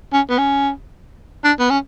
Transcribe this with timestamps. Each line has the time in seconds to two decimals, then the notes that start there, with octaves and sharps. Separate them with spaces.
0.13 C#4
0.29 B3
0.38 C#4
1.44 D4
1.59 B3
1.70 C#4